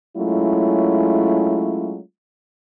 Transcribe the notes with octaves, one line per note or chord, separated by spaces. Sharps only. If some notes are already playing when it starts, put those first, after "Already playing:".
F#3 G#3 A3 C#4 E4 F4